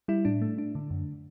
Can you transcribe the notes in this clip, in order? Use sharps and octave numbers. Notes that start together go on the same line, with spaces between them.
G3 E4
A2 D4
A3
D4
D3
F#2